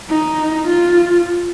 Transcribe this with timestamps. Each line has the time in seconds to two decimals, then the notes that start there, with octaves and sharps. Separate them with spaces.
0.09 D#4
0.67 F4